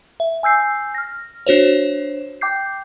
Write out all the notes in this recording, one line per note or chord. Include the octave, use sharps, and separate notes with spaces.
E5
G#5 E6 G6 C7
F6 A#6
D4 F#4 C5 C#5
G5 D6 G6 C7